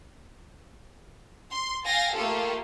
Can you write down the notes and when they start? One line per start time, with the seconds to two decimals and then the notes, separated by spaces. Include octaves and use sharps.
1.51 C6
1.85 F5 G5 G#5 A6 A#6
2.14 A3 A#3 F4 G4 A4